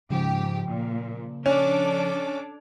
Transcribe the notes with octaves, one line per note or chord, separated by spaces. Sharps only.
G#2 C#3 F3 G4
A#2
C#4 D4 A4 D6